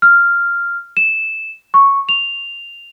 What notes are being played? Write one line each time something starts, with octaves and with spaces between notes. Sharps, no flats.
F6
E7
C#6
F7